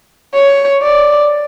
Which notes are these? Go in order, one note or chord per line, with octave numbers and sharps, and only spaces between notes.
C#5
D5